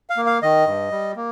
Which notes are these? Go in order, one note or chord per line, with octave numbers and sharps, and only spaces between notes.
F5
A#3
F5
D#3 D#5
G2
G3
A#3